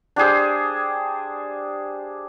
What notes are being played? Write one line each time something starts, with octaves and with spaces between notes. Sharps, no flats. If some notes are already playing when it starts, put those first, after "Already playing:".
D4 G4 G#4 C5